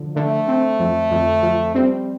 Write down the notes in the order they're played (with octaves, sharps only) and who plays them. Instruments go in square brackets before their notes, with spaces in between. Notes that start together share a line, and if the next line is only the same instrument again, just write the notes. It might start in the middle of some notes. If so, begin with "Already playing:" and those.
Already playing: [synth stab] D3 F3
[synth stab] D3 [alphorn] A3
[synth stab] C4
F2
F2
F3
[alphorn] G3 [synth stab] C4